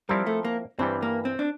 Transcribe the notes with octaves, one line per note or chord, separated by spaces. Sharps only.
F3 G3 C4 E4 A#4
A3
A#3
G2 E3 G3 C4
A#3
C4
D4